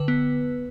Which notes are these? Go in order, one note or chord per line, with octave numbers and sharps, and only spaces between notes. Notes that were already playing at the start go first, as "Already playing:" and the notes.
Already playing: D3 B4
B3